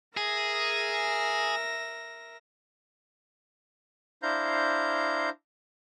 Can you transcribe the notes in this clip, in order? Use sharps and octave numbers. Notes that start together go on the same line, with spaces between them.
G#4 A#4 E5 A#6
D4 E4 C5 F5 A#5 G6